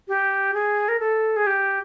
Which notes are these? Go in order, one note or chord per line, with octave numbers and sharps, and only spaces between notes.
G4
G#4
A#4
A4
G#4
G4